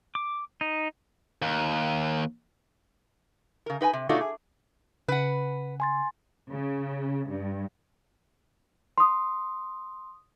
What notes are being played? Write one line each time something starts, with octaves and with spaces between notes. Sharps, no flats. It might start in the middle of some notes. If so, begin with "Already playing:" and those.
D6
D#4
D#2
C#3 A#4
D#4 B4 G5 G#5
C3
B2 A3 D4 D#4 F4 F#4
G#4
C#3 B4 F#5
G#5 C6 A6
C#3
G2
C6 D#6